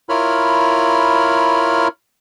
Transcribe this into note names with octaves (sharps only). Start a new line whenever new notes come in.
E4 F4 A#4 C#5 B5 F6